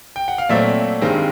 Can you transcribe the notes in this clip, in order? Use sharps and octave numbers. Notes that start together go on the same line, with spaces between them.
G5
F#5
F5
A#2 F#3 A3 C4 D5 E5
G2 D#3 G#3 C4